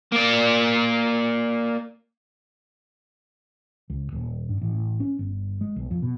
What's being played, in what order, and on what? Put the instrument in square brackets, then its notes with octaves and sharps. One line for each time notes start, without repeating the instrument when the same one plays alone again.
[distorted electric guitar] A#3 D5
[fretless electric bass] C#2
D#1
G2
A1
C#4
G1
G#3
B1
F2
B2